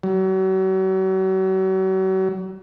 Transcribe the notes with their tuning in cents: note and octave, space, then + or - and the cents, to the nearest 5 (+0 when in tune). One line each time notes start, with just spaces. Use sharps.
F#3 +40